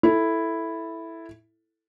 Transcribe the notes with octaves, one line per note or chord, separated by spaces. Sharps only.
E4 A4